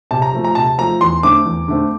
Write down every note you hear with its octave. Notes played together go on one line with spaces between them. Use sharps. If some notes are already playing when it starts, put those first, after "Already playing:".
C3 A5
A#5
F3 A3
A#5
C3 A5
F3 A3 A#5
E2 C6
D3 A3 C4 D6
E2
D3 A3 C4